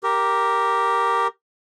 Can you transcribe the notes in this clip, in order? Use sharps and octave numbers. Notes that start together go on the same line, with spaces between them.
G4 A#4